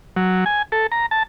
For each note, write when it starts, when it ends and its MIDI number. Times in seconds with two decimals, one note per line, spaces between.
0.16 0.45 54
0.46 0.62 80
0.72 0.87 69
0.92 1.06 82
1.11 1.23 81